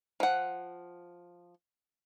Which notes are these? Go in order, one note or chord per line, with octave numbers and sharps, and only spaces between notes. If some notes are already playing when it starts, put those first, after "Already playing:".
F3 F#5